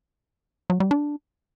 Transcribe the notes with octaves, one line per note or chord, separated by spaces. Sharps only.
F#3
G3
D4